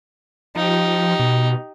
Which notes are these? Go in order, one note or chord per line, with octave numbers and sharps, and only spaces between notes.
F3 D#4 G4
B2